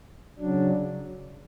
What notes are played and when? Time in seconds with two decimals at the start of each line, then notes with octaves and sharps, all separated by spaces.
0.39 C#3 F#3 D4